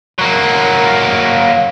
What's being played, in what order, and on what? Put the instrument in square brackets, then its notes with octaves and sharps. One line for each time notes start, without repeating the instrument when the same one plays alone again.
[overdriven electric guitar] F#3 A#3